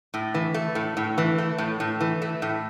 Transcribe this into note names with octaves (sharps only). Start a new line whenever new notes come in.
A2
E3
A3
A2
A2
E3
A3
A2
A2
E3
A3
A2